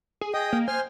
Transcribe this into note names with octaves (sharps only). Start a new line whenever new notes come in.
G#4
G#4 D#5 G5 D#6
A#3
C5 G#5 F6